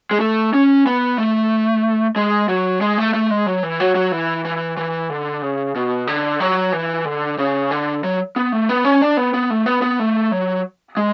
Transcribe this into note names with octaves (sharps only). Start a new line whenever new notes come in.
G#3
A3
C#4
B3
A3
G#3
F#3
G#3
A3
A3
G#3
F#3
E3
F#3
F#3
E3
E3
E3
D3
C#3
B2
D3
F#3
E3
D3
C#3
D3
F#3
B3
A3
B3
C#4
D4
B3
B3
A3
B3
B3
A3
F#3
G#3